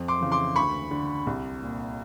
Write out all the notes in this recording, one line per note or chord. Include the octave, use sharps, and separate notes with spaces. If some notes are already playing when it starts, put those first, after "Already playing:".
Already playing: F2
C6 D6
C#3 E3
C6 D6
D2 B5 C#6
D3
C2
A#2